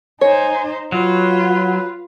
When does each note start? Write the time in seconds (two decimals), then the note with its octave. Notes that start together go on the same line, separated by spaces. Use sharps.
0.21 D#4 C5 C#5 G#5
0.92 F#3 F4 B4